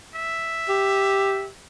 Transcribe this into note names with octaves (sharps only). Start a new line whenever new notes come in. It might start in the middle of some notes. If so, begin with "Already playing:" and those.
E5
G4